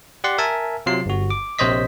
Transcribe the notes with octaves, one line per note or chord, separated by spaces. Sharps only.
G4 D5 F#5 C6
A#4 E5 G#5 A5
C3 F#3 F4 C7
G1 F#4
D6
A#1 C3 C5 C#5 D#5 B6